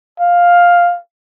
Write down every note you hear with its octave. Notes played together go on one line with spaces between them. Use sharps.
F5